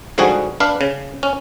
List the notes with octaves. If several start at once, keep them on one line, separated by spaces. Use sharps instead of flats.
G#2 D3 F3 G3 F#4 G#4
D4 B4 F5
C#3
C#4